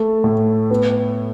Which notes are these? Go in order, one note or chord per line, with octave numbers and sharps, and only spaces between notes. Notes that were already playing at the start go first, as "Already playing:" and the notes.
Already playing: A3
A2
B3